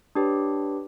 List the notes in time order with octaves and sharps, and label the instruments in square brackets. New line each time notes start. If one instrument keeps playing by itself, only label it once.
[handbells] D4 G4 B4 C#5